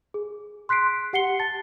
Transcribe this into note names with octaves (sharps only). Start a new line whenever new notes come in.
G#4
C6 F#6 B6 C7 D7
G4 F#5 C7 C#7 G7
A5 A6